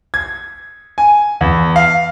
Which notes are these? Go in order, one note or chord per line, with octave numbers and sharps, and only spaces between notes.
G#6
G#5
E2
F5